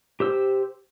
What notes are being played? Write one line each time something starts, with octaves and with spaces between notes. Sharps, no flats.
G4 C5 E6